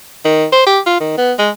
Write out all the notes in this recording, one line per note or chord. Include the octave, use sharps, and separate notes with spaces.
D#3
C5
G4
F4
D#3
B3
G#3